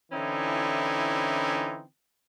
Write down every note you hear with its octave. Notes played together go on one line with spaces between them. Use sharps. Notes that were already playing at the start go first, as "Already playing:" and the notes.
D3 E3 C4 C#4 D#4 E4